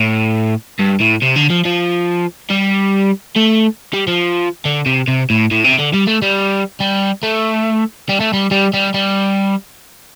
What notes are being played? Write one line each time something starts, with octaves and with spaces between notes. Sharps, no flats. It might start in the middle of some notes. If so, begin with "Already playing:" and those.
Already playing: A2
G2
A2
C3
D3
F3
F3
G3
A3
G3
F3
D3
C3
C3
A2
A2
C3
D3
G3
A3
G3
G3
A3
G3
A3
G3
G3
G3
G3